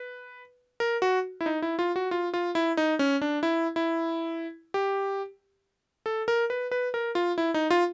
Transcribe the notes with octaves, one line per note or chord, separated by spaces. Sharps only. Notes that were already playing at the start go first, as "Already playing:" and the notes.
Already playing: B4
A#4
F#4
E4
D#4
E4
F4
F#4
F4
F4
E4
D#4
C#4
D4
E4
E4
G4
A4
A#4
B4
B4
A#4
F4
E4
D#4
F4